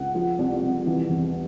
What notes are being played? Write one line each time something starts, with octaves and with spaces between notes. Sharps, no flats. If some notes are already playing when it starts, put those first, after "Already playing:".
Already playing: C#2 F#5
F3
C2
C2
E3
E2